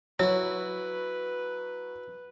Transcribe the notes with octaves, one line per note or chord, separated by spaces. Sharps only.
F#3 E4 F#4 B4 C#5